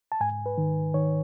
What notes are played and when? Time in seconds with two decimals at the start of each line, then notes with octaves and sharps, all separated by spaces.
0.12 A5
0.20 G#2 G#5
0.46 B4
0.58 D#3
0.94 D#3 C#5